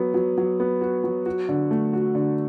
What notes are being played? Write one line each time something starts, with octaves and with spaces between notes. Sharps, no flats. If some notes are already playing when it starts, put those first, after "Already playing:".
Already playing: F#3 B3
F#3
F#3
B3
F#4
F#3
F#4
D3
A3
F#4
D3